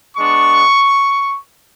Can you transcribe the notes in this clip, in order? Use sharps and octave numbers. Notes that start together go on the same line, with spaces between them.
G#3 B3 D4 C#6